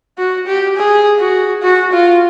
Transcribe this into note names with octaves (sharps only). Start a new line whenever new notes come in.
F#4
G4
G#4
F#4
F#4
F4